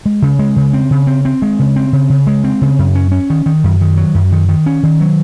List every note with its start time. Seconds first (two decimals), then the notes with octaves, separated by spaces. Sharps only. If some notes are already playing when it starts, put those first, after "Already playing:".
0.06 G#3
0.22 C#3
0.39 G#3
0.56 C#3
0.73 C4
0.91 C#3
1.07 C4
1.25 C4
1.42 G#3
1.59 C#3
1.76 C4
1.93 C#3
2.10 C#3
2.27 G#3
2.44 C4
2.62 C#3
2.79 F#2
2.95 C#4
3.12 C#4
3.30 D#3
3.46 D#3
3.64 F#2
3.81 D#3
3.97 F#3
4.15 F#2
4.32 D#3
4.49 D#3
4.66 C#4
4.83 D#3
5.01 F#3